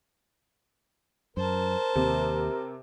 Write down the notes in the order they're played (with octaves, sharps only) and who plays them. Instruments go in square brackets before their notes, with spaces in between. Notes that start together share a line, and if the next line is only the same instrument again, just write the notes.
[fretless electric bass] F#2 [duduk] A#4 [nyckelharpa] C5 A5
[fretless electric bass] D#2 [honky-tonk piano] C3